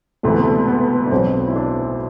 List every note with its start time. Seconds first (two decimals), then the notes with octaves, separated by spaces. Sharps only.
0.23 E1 D2 C3 E3 A3
0.33 B3
0.42 A3
0.68 B3
1.07 D4
1.11 B1 B2 C4
1.48 E4
1.56 D4